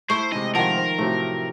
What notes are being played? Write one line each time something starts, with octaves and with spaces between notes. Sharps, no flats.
A3 E4 C5 C#6
C3 G#3 D#5
D#3 F3 A#4 F#5 A5
C5
A2 C3 F#3 A3